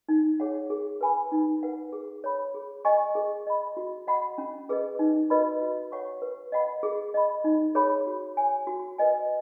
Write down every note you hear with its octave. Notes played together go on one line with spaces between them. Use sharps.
D#4
G#4 C#5 F#5
G#4
B4 G#5 B5
D#4
B4 F#5
G#4
C#5 B5
G#4
D#5 G#5 C#6
G#4
D#5 B5
F#4
D#5 F#5 B5
C#4
G#4 B4 D#5
D#4
F#4 B4 D#5 B5
F#4
C#5 F#5 C#6
B4
D#5 F#5 B5
G#4
D#5 B5
D#4
G#4 C#5 B5
F#4
C#5 G#5
F#4
B4 D#5 G#5